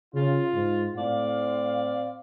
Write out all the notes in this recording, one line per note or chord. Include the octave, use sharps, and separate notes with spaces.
C#3 F4
G#2
A2 C4 D5 F5